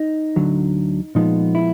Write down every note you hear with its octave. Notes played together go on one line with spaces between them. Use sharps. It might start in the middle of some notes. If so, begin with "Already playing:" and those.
Already playing: D#4
D2 D3 F#3
A#2 F3 G#3 B3 D#4
E4